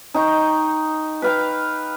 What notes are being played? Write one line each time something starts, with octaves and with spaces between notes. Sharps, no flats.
D#4 D#5 G5 C#6
B4 F5 G5